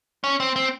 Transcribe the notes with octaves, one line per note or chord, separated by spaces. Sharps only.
C#4
C4
C4